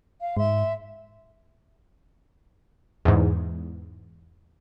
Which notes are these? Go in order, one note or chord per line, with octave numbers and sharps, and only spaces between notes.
F5
G#2 E5 C6
E2 G#2